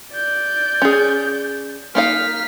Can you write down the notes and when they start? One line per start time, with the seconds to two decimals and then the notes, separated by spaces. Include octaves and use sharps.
0.12 D5 G6
0.82 C#4 G#4
1.95 A#3 D#4 F5 F6 B6